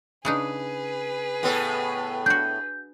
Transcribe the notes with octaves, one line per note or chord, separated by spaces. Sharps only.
C#3 D4 D#4 G#4 B4
A2 B3 A4
D4 F#4 G6